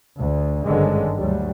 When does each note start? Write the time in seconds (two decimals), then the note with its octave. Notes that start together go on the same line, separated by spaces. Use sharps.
0.20 D2
0.65 G#1 G2 D3 D#3 G#3 C#4
1.18 D2 F#3 G3